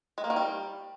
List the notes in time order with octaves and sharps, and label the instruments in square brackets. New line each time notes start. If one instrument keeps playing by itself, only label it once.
[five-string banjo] G#3
A#3
D#3
G3